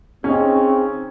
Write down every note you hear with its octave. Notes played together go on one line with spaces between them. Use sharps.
C#3 C4 C#4 D#4